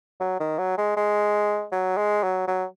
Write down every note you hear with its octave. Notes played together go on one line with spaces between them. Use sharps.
F#3
D#3
F#3
G#3
G#3
F#3
G#3
F#3
F#3